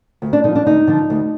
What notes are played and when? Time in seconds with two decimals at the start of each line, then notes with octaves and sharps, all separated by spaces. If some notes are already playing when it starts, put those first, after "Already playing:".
0.22 D2
0.33 D4
0.44 D3 D#4
0.48 F3
0.55 D4
0.66 D2 D#4
0.87 D3 F3
1.10 D2